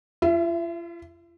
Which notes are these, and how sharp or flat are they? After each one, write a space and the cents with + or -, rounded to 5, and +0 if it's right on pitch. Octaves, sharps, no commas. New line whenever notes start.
F4 -40 E5 +25